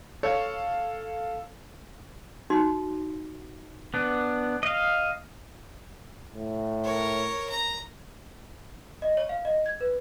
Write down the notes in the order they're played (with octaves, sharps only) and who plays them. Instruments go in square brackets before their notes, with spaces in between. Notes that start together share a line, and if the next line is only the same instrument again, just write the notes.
[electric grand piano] A4 F5 [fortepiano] C#5
[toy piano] D#4 F#4 C6
[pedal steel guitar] B3 D4
D#5 F5
[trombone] A2
[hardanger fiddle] A#4 C#5
A#5
[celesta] D#5
C#5
F5
D#5
G#6
B4